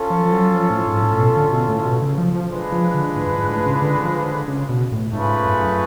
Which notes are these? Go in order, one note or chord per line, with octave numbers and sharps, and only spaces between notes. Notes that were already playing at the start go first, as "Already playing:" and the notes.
Already playing: C#4 F4 A4
F3
F3
F#3
F3
A2
G#2
A2
A2
B2
D3
B2
A2
B2
C#3
F3
F3
G#3 D4 F4 B4
F3
D3
A2
F#2
G#2
A2
C#3
D3
F3
D3
C#3
B2
A2
G#2 A3 C#4 F4 G#4 B4
F#2